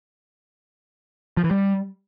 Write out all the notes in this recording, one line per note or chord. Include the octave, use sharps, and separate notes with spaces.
F3
E3
G3